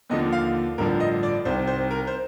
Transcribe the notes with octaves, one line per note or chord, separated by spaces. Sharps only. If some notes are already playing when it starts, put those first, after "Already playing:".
D#2 D3 F3 D#5
F5
A1 G2 D3 F3 A#4
D#5
D5
C2 C3 D#3 C5
C5
A#4
C5